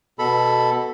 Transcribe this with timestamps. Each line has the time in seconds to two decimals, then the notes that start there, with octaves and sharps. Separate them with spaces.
0.19 B2 A4 B5